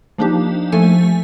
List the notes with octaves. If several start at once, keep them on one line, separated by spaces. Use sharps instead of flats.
F3 A#3 D4 D#4 G4
F3 A3 A4 G#5